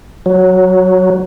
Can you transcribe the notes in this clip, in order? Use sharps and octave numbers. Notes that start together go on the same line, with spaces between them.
F#3